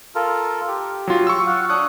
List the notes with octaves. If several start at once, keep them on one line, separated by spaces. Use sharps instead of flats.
F4 A4 A#4
G4
F#3 F4
C#6 E6
F5 F#5
D4 C#5 D#6 F#6